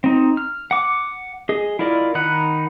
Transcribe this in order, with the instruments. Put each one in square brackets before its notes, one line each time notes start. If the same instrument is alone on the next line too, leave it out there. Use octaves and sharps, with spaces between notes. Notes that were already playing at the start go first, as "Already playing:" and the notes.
[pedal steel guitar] C4 D#4
F6
F#5 D6
G#4 D#5
E4 F4 A#4 D5 D#5
D#3 D#4 F#5 B5 F#6